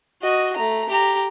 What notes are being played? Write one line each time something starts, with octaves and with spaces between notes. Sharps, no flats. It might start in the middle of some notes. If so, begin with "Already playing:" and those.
F#4 D#5
A3 A#5
G4 A#5